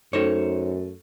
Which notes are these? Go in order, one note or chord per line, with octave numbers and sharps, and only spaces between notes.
F#2 A3 D#4 C5 C#5